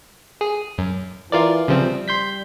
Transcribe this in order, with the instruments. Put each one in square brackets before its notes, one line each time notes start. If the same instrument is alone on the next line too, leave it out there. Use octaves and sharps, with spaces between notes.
[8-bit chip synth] G#4
F#2
[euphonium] E3 [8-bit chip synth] F4 A#4 D5
[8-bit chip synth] C#3 F3 C4 [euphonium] G3
[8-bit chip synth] C6 G6 B6